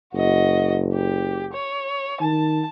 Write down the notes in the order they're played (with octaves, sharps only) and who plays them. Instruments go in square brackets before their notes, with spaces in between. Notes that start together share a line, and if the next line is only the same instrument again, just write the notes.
[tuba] F#1 [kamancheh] F#4 D#5
[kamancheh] G4
C#5
[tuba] D#3 [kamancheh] A5